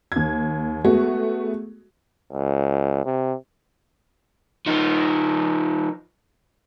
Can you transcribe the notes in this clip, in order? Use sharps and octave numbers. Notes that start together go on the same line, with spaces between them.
D#2 G#6
G#3 A3 B3 F#4
C#2
C3
F3 D#4